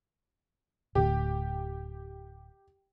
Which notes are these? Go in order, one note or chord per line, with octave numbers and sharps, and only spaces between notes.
D1 D2 G4